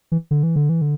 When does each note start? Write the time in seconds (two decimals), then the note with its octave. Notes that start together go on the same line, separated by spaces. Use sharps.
0.12 E3
0.31 D3
0.43 E3
0.56 D3
0.69 E3
0.81 D3